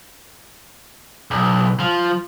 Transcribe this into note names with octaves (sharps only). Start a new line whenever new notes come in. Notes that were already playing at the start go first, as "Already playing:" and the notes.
B1
F3